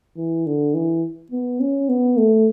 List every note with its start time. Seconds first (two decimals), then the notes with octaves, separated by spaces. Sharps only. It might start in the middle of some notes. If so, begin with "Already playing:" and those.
0.17 E3
0.46 D3
0.74 E3
1.31 B3
1.60 C#4
1.89 B3
2.17 A3